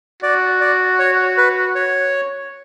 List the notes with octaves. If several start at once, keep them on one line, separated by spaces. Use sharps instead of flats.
F#4 D5
D5
C#5
B4
C#5